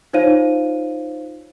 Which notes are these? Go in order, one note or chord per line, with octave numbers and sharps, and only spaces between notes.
D#4 F4 C5 C#5 F5 D#7